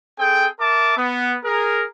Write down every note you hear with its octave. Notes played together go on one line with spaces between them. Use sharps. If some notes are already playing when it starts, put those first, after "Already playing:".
C4 G#4 A4 G5
A#4 E5 A5 D6
B3
G#4 A#4